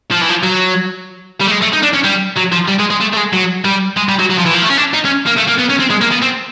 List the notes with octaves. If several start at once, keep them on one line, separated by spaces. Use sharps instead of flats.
F3
E3
F3
F#3
G3
A3
G#3
A3
D#4
D4
C#4
G3
F#3
F3
G3
G#3
G#3
A3
A3
G#3
F#3
G3
G#3
G3
F#3
F#3
F3
E3
F3
A3
C#4
D4
D#4
C#4
A#3
A3
A#3
B3
C#4
C4
G#3
A#3
B3
C4